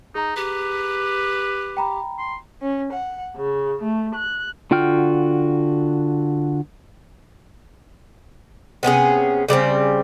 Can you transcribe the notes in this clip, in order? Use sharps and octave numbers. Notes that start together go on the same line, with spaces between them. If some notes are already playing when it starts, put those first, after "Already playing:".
D#4 G#4 A#5
G4 B4
G5 A#5 B5
C6
C#4
F#5
C#3
A3
F#6
D3 F4 F#4 G5 F6
C3 B3 C#4 G#4
C#3 G3 B3 C4